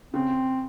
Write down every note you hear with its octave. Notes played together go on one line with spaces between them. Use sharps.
C#3 C4